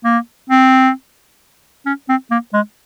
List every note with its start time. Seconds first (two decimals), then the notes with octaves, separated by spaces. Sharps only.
0.04 A#3
0.50 C4
1.86 C#4
2.09 C4
2.31 A#3
2.54 G#3